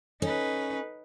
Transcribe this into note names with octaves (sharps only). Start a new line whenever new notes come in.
C#4 D#4 A4 B4